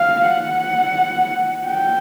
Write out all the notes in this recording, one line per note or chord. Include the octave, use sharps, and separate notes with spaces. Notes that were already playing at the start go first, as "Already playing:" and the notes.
Already playing: F5
F#5
G5